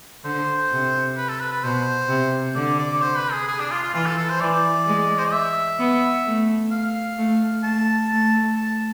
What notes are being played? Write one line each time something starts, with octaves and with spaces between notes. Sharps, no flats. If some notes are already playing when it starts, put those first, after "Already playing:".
D3 C5
C3
B4
A4
B4
B4
B2 C5
C3
D3 D5
D5
C5
B4
G#4
G#4
D4
F4
F4
E3 F4
A4
A4
C5
E3 D5
G#3
C5
D5
E5
B3
A3
F5
A3
A3 A5
A3
A5